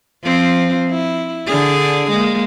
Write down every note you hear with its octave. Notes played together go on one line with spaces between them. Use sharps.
F3 C4
E4
D3 D4 G#4
G#3 A#3